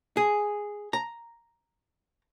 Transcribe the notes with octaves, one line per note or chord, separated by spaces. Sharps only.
G#4
A#5